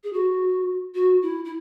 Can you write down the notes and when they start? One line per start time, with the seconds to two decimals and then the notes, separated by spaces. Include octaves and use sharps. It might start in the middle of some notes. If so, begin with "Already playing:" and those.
0.04 G#4
0.13 F#4
0.95 F#4
1.22 E4
1.45 E4